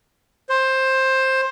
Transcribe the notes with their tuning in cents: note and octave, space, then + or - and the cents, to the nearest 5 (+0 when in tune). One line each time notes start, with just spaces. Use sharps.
C5 +15